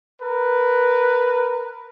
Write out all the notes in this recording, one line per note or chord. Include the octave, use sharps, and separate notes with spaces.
A#4 B4